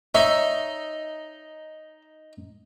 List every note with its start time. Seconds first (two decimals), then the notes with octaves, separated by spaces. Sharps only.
0.15 D#4 C#5 E5